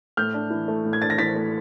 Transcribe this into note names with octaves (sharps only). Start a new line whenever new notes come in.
A2 F6 G6
D4
E3
A3
A2
G#6
D4 A6
A#6
E3 A6 B6
A3